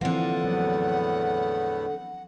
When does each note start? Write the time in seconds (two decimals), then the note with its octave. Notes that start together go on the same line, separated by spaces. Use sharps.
0.01 D3 E3 F3 A#3 C4 F4 F#5
0.44 E2 A2 F#3 B3